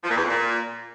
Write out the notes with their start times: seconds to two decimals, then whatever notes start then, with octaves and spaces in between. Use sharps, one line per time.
0.03 F3
0.10 A#2
0.16 E2
0.23 F2
0.29 A#2